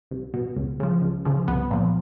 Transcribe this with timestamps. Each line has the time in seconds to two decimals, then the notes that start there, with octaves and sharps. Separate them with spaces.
0.11 C2
0.34 B2
0.56 C#2
0.80 C#3 F3
1.02 C#2
1.25 C#3 F3
1.48 C2 B3
1.71 A#2 F3